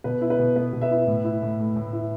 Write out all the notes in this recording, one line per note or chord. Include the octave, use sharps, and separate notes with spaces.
B2 B4
E4
B4
B2
B3 B4
B2
B4 E5
E4
A2
E4
A2
A3
A2
E4